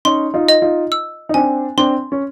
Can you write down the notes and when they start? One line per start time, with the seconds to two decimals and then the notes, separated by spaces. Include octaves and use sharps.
0.05 C#4 D#4 C6
0.34 D#4 F4
0.49 D#5
0.62 D#4 F4
0.92 E6
1.29 D#4
1.34 C4 D4 G#5
1.77 C4 D4 C6
2.12 C#4